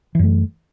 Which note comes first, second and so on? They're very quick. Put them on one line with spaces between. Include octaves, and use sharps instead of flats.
E3 F#2 A3